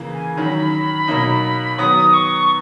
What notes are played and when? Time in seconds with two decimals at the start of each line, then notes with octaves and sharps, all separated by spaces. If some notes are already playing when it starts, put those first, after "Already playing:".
Already playing: C#3 E3 A#3
0.14 G#5
0.37 D#3 F#3 C#4 B5
1.08 B2 F#3 A#3 D#4
1.78 D#3 F#3 B3 D#6
2.14 C#6